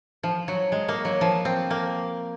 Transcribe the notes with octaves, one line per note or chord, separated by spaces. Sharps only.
F3
F#3
G#3
A#3
F#3
F3
C4
A#3